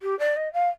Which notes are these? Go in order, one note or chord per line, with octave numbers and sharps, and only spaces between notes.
G4
D5
D#5
F5